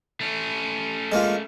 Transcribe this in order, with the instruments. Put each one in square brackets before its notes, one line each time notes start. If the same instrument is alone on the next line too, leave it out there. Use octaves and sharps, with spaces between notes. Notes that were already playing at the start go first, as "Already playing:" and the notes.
[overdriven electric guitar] A3 C#4
[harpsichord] G#3 A#3 F4